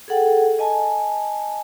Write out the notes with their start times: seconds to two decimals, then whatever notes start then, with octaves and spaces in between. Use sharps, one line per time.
0.08 G#4 A4 F#5 G5
0.59 D#5 G#5 A5